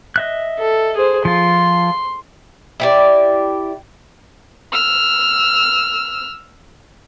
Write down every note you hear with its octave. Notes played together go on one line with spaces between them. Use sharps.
D#5 E5 F#6
A4
G#4 C5
F3 F4 C6
E4 G4 D5
E6 F6